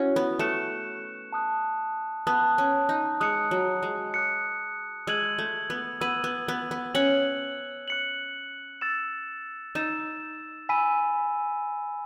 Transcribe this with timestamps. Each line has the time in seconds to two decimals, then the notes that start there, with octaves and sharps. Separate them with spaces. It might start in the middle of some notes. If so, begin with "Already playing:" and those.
Already playing: C#4 E4 F#4
0.16 B3
0.39 A3 C#6 F#6 C#7 E7
1.32 A5 D#6 F#6
2.27 B3 A5 D#6 F#6
2.58 C#4
2.89 D#4
3.20 G#3 D#6 F#6 C#7
3.51 F#3
3.83 G#3
4.14 D#6 F#6 C#7
5.07 G#3 E6 G#6 D#7 F#7
5.39 A3
5.70 B3
6.01 B3 E6 G#6 D#7 F#7
6.24 B3
6.48 B3
6.71 B3
6.95 C#4 F#6 C#7 F#7
7.88 F#6 C#7 F#7
8.81 E6 A6 E7
9.75 D#4 E6 A6 E7
10.69 G#5 B5 E6 B6 D#7